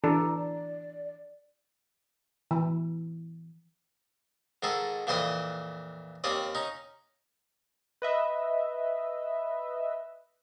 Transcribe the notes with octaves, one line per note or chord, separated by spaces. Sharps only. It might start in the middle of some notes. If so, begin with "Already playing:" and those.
E3 D4 A4 A#5
D5
E3
G#2 D#3 G#4 A4
F2 A#2 E3 C5 C6 D#6
D#2 C4 C#4 D5 D#6
C#4 D#4
B4 D#5 E5